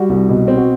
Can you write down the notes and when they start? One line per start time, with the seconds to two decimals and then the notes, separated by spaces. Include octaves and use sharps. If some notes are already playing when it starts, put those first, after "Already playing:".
Already playing: G3 F#4
0.09 C2
0.29 B2
0.48 C4
0.57 F#4